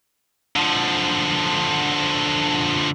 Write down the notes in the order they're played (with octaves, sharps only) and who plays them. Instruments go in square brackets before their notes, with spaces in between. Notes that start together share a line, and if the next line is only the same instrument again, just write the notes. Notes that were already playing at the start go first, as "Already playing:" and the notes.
[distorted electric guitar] D3 F3